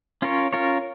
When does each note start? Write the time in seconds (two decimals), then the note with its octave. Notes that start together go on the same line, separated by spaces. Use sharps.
0.22 C#4 F4 A#4 C#5
0.53 C#4 F4 A#4 C#5